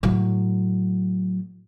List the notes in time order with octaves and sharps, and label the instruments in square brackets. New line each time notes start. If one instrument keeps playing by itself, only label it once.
[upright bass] A2 F#3